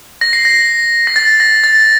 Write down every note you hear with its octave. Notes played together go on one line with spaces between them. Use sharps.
A#6
C7
A#6
A#6
A6
A#6
A6